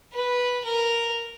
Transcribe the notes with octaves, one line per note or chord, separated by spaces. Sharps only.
B4
A#4